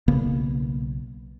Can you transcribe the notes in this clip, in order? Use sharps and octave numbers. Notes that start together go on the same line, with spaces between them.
B1 C#3 A#3 B3